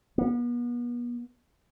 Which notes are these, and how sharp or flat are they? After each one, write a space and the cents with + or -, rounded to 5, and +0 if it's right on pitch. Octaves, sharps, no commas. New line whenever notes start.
B3 -40